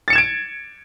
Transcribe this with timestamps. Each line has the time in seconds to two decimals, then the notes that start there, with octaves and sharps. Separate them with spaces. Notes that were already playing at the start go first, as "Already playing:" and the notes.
0.08 A6
0.10 C#7
0.13 E7
0.15 G#6
0.18 D7